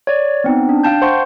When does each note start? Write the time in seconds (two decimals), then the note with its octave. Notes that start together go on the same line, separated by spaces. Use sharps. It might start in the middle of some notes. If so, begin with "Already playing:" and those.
0.07 C#5 D5
0.44 B3 C4 D#4
0.69 D4
0.83 F5 G5 A5 G6
1.02 C5 F#5 C6 C#6 G6